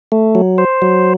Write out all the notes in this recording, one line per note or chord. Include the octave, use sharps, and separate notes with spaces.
A3
F#3
C5
F#3